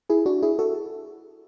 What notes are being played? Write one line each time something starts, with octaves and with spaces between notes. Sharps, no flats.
E4 G#4
D4 F#4
E4 G#4
F#4 A4